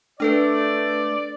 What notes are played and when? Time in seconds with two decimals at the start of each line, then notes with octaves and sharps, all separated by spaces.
0.20 A3 D4 A4 B4 D5